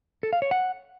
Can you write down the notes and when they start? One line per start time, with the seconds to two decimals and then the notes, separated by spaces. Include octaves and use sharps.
0.23 A4
0.33 F5
0.42 C#5
0.51 F#5